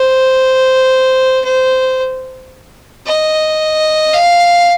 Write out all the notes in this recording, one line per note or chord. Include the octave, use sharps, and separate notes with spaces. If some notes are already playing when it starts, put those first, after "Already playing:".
Already playing: C5
C5
D#5
F5